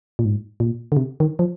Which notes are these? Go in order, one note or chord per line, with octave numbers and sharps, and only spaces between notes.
A#2
G#2
A#2
D3
C3
D#3
F3